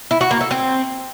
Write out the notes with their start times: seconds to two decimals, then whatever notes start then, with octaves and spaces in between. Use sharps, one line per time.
0.11 E4
0.21 F#4
0.31 A#3
0.41 A4
0.51 C4